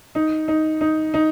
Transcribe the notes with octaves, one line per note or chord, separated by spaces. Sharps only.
D#4
D#4
D#4
D#4